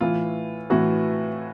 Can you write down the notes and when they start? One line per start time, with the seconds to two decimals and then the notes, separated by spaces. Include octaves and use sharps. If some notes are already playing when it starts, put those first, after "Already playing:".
0.01 A2 E3 F4
0.70 A2 E3 F#4